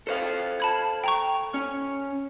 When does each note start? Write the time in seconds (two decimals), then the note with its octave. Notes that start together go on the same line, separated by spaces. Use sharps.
0.07 A4 C5 F5
0.60 A5 B5 G#6
1.04 G5 A#5 C#6
1.54 C#4